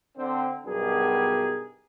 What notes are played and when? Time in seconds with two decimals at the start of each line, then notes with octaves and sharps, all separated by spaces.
0.18 D3 C4
0.66 B1 G2 B2 G4 G#4 A#4